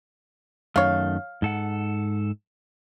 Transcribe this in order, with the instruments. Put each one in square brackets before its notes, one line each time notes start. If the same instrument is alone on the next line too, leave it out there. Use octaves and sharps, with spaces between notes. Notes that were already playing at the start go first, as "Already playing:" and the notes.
[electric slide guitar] F#2 D#3 A3 [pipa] C#5 F5
[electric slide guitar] G#2 A4 F#5